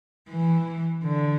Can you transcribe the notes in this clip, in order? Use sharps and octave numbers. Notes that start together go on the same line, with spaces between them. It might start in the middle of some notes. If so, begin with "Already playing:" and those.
E3
D3